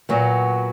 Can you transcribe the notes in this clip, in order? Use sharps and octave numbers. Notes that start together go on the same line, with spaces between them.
A#2 F#3 B3 F#4